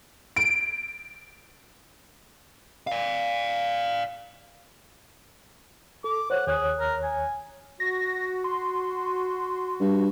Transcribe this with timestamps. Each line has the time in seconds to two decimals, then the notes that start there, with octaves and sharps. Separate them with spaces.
0.36 D7
2.87 D5 F5
6.04 A4 D6
6.30 C5 C#5 F#5
6.47 D#2 G#4 C#5 F#6
6.80 A#4
7.03 G#5
7.80 F#4 A#6
8.44 C6
9.81 G2